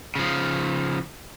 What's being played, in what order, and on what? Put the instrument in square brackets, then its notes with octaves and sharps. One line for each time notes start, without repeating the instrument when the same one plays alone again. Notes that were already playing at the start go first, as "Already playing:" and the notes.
[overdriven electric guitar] C#3 F3